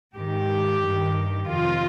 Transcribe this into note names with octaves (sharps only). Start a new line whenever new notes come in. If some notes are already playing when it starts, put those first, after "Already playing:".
G#2 D#3 G4
G2 D#3
F2 C3 D#3 F4